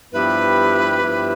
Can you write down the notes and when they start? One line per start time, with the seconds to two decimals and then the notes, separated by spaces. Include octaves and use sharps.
0.12 G2 F3 B3 E4 G4 B4
1.02 G2 F3 B3 E4 G4